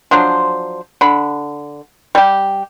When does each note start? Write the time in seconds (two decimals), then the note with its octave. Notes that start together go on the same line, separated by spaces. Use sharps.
0.11 F3 F#3 D4 C5
1.01 D3 B5
2.15 G3 G4